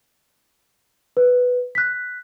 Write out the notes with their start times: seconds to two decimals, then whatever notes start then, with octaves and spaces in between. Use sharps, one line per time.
1.17 B4
1.75 F#6 B6